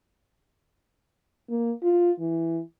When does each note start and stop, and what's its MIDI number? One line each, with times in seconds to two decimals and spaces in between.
1.50 1.72 58
1.83 2.12 65
2.20 2.61 52